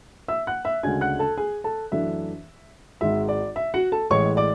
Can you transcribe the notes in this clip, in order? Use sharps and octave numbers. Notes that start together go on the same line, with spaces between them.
E5 E6
F#5 F#6
E5 E6
D2 C#3 G#3 D4 G#5 G#6
F#5 F#6
A4 A5
G#4 G#5
A4 A5
F#2 E3 A3 D4 E5
G#1 G#2 G#3 E5
D5
E5
F#4 F#5
A4 A5
A1 A2 E3 G#3 C#5 C#6
D5 D6